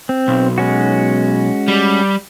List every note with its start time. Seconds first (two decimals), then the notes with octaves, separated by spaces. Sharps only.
0.09 C4
0.28 B1
0.58 G#3 C#4 F#4
1.68 G3